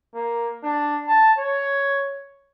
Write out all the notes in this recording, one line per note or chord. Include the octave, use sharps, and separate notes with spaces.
A#3
D4
A5
C#5